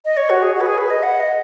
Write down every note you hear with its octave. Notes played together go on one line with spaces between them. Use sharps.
D#5
C#5
F#4
G#4
F#4
B4
G#4
B4
D#5
F#5
D#5